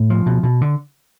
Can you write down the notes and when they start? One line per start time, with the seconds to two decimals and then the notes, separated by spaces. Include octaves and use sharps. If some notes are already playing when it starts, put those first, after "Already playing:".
Already playing: A2
0.10 F3
0.26 B2
0.43 B2
0.61 D3